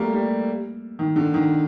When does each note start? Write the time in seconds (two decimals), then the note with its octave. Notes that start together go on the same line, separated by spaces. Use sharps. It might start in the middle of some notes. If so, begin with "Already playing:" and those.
Already playing: G3 A3 A#3
0.13 G3
0.99 D#3
1.16 D3
1.34 D#3